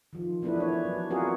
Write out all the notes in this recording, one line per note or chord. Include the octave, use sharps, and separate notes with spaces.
D#3 F3
E3 A3 B3 D4 E4 B4
E3 C#5
F#3
B3 C4 F4 F#4 G#4 A#4